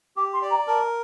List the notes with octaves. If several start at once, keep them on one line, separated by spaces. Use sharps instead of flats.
G4 D6
C6
D5
A#5
A#4 A5